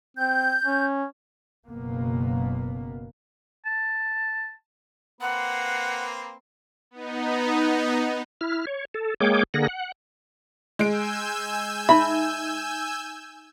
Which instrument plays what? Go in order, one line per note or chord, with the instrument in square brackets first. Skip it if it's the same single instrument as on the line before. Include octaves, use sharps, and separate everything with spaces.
[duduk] C4 [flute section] G6
[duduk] C#4
[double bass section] F#1 B2 A#3 B3
[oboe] A5
[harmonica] A#3 C4 B4 [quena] F#5
[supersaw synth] B3 D#4
[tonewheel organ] E4 F6
C#5
A4
G#3 A#3 G#4 C#5 G5 D6
D3 A#3 G#4 F#5 A#6
F#5
[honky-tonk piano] G#3 D7 [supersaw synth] G#5 E6 G6
[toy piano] D#4 E5 [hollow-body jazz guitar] B5